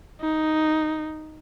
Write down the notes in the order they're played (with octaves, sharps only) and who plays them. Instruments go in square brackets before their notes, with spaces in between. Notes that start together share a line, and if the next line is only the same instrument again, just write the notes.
[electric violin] D#4